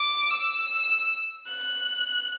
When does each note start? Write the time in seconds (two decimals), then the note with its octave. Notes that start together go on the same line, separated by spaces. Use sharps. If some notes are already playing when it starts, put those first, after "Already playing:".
Already playing: D6
0.30 E6
1.47 F#6